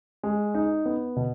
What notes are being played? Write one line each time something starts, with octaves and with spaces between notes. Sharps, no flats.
G#3
D#4
B3
B2